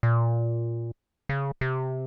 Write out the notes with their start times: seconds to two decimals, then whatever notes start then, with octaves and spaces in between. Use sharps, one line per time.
0.03 A#2
1.29 C#3
1.61 C3